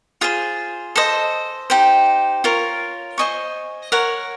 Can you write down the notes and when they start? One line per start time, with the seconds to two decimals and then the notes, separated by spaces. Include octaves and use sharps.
0.21 F4 G#4 C5
0.96 A4 C5 D#5
1.70 D#4 G4 C5
2.44 F4 A#4 C#5
3.18 C5 D#5 G#5 C#6
3.92 A#4 C#5 F#5